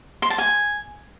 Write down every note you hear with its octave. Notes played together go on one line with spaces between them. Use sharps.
C6
A5
G#5